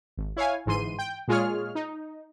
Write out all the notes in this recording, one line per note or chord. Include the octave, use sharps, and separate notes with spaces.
G#1
E4 C#5 F5 G#5
G1 G#2 E3 C6 D#7
G5
A#2 G#3 F4 G#4 C#5 F6
D#4